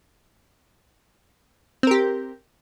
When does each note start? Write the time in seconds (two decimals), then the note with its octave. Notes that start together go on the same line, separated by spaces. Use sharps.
1.83 C4
1.87 A#4
1.91 G4